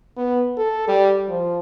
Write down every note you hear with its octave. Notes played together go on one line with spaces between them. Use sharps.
B3
A4
G3
F3